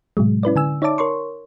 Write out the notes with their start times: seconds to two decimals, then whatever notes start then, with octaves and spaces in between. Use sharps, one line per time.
0.17 A2 C3 F#3 G#3
0.43 C#4 E4 B4 D5
0.56 D3 G#5 E6
0.82 D#4 C#5 D5 E5 A5 D6
0.98 A#4 C#5 C6 C#6